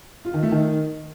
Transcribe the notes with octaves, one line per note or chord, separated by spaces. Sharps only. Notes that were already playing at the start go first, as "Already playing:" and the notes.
F4
D#3
A3
D#3